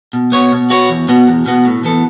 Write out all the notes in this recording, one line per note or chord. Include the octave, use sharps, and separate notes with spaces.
B2
B3 F#4 C#5
B2
B3 F#4 C#5
E2
B2 B3 F#4
E2
B2 B3 F#4
A2
E3 B3 A4